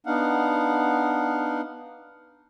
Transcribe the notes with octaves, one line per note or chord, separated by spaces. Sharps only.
B3 D4 D#4 F5 F#5